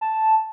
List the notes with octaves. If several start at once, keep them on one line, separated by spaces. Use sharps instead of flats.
A5